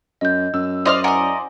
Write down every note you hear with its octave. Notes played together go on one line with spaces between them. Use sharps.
F#2 D#5 G6
F#2 E6
E4 C5 D5 D#5 F5 F6
A#4 D#5 F#5 G#5